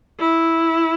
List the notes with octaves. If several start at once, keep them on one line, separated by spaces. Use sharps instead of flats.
E4